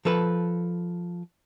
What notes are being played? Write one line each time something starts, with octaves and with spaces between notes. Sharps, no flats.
F3 A4 B4